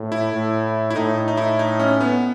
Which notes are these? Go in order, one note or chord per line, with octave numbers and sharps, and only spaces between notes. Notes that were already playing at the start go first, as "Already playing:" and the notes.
Already playing: A2
E4
A2
E4
A2 D#4
D#4
E4
D#4
C#4
B3